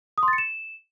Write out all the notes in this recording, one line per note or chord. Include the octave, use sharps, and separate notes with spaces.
D#6
C6
A6
C#7
E7